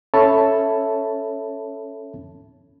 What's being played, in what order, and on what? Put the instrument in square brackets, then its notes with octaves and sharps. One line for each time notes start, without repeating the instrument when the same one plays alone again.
[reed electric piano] C#4 A4 C#5 E5 A5 B5